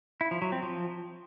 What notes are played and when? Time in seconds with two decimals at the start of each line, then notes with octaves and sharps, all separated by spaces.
0.21 E4
0.31 F3
0.42 F#3
0.52 C4
0.63 F3